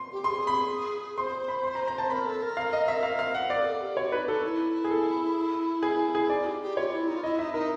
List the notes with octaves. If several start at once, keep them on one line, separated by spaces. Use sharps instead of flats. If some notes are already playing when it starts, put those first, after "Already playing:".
Already playing: C6
G4
G#4 C6
B5
C5 C6
B5
C6
A#5
A#5
A5
A#4 B5
A4
A#4
F5
D#5
E5
F5
F5
F#5
A#4 D5
G#4
A4
G4
F#4 C#5
D#4 B4
D#4 A4
E4
G#4
A4
G#4
G#4
D#4 D5
G4
G4
F4 C#5
E4
D#4
F4
E4 D#5
D#4 E5
D#4 A#4